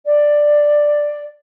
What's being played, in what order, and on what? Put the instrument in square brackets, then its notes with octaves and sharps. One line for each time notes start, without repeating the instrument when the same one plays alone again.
[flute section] D5